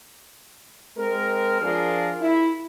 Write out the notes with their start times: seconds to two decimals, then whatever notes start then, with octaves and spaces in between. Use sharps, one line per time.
0.98 G#3 C4 A#4
1.62 F3 D4 F4 G#4 A#4
2.21 E4